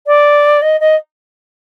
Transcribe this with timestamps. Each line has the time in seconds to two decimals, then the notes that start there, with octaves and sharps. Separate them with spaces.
0.07 D5
0.62 D#5
0.80 D#5